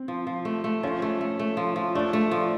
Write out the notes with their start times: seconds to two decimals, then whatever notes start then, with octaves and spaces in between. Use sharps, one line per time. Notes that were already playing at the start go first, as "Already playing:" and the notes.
Already playing: C4
0.08 F3
0.27 F3
0.45 A3
0.64 A3
0.83 F3 C#4
1.02 A3
1.21 A3
1.39 A3
1.57 F3
1.76 F3
1.95 A3 D4
2.13 A3
2.31 F3